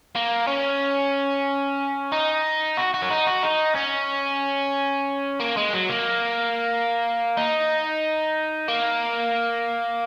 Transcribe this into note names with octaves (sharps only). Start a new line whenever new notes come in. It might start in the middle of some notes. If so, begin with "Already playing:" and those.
A#3
C#4
D#4
F#4
F#4
C#4
D#4
F#4
D#4
C#4
A#3
G#3
F#3
A#3
D#4
A#3